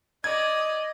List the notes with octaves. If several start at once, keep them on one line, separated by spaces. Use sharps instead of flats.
D5 D#5 D#6 G#6